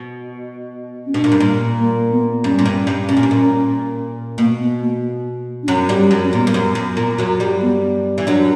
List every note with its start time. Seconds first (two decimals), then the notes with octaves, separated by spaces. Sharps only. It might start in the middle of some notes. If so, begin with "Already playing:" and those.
Already playing: B2
1.06 C#4
1.14 B2 D4
1.24 A#2
1.32 G2
1.40 A#2
1.79 A#3
2.11 B3
2.44 G2 C#4
2.59 A#2
2.66 G2
2.87 G2
3.09 B2 C#4
3.17 A#2
3.23 G2
3.31 A#2
4.38 B2 A#3
4.60 B3
4.81 A#3
5.63 D4
5.68 F#2 F#3 C#4
5.89 G2 G3
6.11 F#2 F#3
6.24 C#4
6.33 A#2 B3
6.47 G2
6.54 F#2
6.75 F#2
6.97 A#2
7.18 F#2 F#3
7.40 G2 G3
7.62 B3
8.18 E3
8.27 F#2 F#3 D4